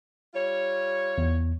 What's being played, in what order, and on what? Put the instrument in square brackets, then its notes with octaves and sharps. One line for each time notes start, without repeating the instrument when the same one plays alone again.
[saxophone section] G3 F4 C#5
[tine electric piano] E2